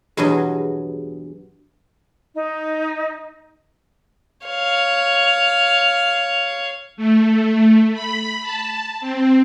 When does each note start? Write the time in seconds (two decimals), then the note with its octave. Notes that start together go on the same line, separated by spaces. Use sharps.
0.17 E2 G2 B2 F#3 G#4 D#5
2.35 D#4
4.47 C#5 F5
6.97 A3
7.93 B5
8.42 A5
9.00 C4